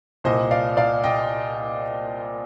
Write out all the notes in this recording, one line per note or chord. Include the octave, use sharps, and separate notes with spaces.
C2 A#2 C5 D#5
D5 F5
D5 F5
D#5 G5